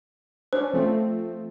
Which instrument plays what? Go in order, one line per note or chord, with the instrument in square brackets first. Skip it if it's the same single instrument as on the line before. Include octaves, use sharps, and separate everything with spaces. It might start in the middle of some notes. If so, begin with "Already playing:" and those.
[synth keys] C#4 D4 [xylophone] C5
[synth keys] F3 A3 C4